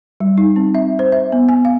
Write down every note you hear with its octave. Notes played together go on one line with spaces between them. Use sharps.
G3
D#4
C4
E5
C5
E5
B3
G#5
F5